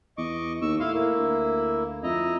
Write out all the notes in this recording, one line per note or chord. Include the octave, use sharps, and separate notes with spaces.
E2 D#5 C#6 D6
D#2 C#6 E6
A2 E4 F5 C6
A#3 E4
D2
F2 E4 D#5 A#5